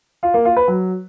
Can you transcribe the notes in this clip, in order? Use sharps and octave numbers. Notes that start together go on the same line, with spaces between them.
F4
A#3
F4
B4
F#3